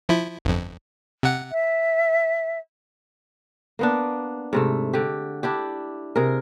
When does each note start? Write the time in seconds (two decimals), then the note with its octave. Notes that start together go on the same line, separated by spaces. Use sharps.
0.09 F3 E4
0.45 G1 F2
1.23 C3 F#5
1.51 E5
3.79 A#3 B3 D4
4.53 G#2 C3 A3
4.93 D3 G4
5.43 D4 E4 G4
6.16 C3 G#4 A#4